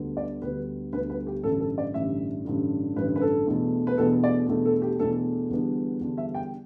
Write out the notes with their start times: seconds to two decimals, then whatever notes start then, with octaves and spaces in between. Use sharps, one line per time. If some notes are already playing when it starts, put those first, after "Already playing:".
Already playing: D2 D3 G3 B3
0.17 D5
0.42 D2 D3 G3 B3 B4
0.93 D2 D3 G3 B3 B4
1.10 B4
1.27 G4
1.44 A1 G2 D3 A4
1.60 A4
1.78 D5
1.94 A1 G2 D3 E5
2.45 A1 G2 D3
2.96 A1 G2 D3 B4
3.16 B4
3.21 A4
3.47 E2 B2 A3 D4
3.87 B4
3.98 E2 B2 A3 D4 A4
4.24 D5
4.48 E2 B2 A3 D4
4.65 A4
4.82 G4
4.99 E2 B2 A3 D4 A4
5.50 E2 D3 G3 B3 D4
6.00 E2 D3 G3 B3 D4
6.18 E5
6.35 G5